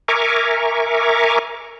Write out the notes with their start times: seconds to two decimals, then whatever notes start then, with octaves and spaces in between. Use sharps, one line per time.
0.08 A#4 E5 G#5 A#5 C#6 D6